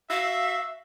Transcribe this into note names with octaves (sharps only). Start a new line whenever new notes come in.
F#4 E5 F5